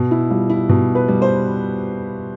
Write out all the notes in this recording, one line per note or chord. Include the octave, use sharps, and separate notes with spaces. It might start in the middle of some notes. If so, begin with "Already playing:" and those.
Already playing: B2
E4
G3 F4
E4
B2
B4
G3
C5